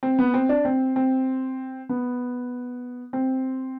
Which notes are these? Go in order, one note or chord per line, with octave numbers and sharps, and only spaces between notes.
C4
B3
C4
D4
C4
C4
B3
C4